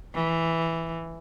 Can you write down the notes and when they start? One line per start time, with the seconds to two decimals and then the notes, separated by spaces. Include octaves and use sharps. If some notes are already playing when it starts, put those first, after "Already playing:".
0.14 E3